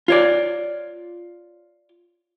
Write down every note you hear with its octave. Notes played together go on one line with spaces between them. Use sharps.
F4 C#5 D5